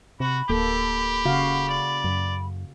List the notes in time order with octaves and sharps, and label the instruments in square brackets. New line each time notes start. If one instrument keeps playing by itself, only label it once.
[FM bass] C3 [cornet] F#4 [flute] B5
[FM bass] D1 [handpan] A#3 A4 [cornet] G4
[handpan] C#3 F#4 F5
[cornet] D5
[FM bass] F#2